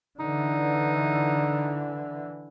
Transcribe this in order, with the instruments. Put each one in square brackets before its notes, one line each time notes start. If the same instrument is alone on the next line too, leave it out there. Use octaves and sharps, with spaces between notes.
[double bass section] D3 E3 [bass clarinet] D#4